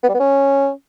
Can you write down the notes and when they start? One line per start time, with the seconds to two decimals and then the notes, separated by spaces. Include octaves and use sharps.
0.04 B3
0.09 G3
0.14 B3
0.20 C#4